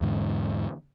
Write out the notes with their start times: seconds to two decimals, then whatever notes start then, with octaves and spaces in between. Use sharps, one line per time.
0.01 E2 G#2 D3